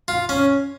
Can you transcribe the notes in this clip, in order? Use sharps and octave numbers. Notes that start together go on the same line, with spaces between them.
F4
C#4